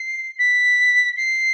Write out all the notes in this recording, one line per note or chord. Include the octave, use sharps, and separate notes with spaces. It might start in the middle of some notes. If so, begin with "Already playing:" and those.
Already playing: C7
B6
C7